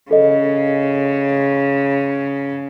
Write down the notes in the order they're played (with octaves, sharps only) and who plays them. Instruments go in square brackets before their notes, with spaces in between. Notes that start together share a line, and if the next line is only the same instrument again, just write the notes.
[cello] C#3 [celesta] A4 D#5